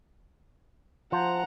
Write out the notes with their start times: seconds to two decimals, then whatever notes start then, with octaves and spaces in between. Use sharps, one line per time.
1.12 F3 C5 F#5 A5 A#5